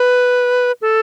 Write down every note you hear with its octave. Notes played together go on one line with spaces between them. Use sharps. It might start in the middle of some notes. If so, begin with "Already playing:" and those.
Already playing: B4
A4